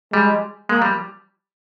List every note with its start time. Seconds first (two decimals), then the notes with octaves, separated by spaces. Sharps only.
0.13 G3 G#3
0.69 G#3 A#3
0.82 G3